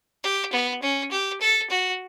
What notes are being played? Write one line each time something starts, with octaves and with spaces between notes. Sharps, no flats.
G4
B3
C#4
G4
A4
F#4